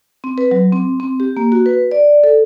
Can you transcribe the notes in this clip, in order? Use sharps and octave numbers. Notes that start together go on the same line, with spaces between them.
C4
B4
F#3
C4
C4
G4
A#3
F#4
B4
D5
A4